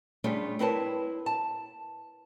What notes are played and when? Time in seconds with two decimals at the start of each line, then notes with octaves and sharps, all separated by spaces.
0.24 G3 A3 C#4 D4 F4 G#4
0.59 C4 E4 A#4 B4 C#5 A5
1.26 A5